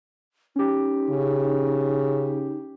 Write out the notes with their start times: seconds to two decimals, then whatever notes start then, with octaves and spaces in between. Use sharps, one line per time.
0.56 C#4 D#4 G4
1.10 C#3